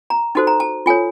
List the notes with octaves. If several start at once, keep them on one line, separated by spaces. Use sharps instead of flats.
A#5
D#4 F#4 A4 C5 A5
A#5
A5
F4 A4 C#5 G#5